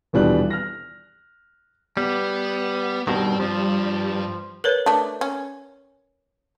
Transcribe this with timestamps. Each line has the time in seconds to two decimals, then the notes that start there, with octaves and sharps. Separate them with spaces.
0.13 D#1 B2 E3 G3 D4 F#6
0.50 F6 A#6
1.97 G3 B3
3.07 G2 B2 D#3 G3 C4
3.40 G2 F3
4.64 A#4 B4 C#5
4.86 A3 D4
5.21 C#4